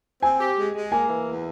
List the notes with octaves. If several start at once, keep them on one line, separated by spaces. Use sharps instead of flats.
C4 G#5
G4
G#3
G#3
A#3 G#5
E3
E2